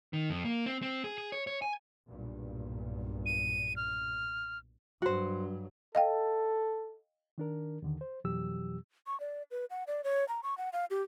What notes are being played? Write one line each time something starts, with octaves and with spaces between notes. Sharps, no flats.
D#3
F2
A#3
C4
C4
G#4
G#4
C#5
C#5
G#5
B1 G2 A#2
D#7
F6
G2 F#3 F#4 C5
A4 D#5 F5 G5
D#3 D4 A#4
D#2 D3 D#3
C5
F2 B2 E3 F#3 G4 E6
C#6
D5
B4
F#5
D5
C#5
A#5
C#6
F#5
F5
G4